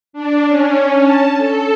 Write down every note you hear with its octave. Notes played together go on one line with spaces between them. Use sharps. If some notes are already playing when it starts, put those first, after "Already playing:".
D4
C#4
A5
A4